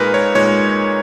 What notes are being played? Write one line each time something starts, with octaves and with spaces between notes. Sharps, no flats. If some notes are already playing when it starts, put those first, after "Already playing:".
Already playing: A#2 G#3 D#4 A#4 B4
C#5
A#2 G#3 D#4 C#5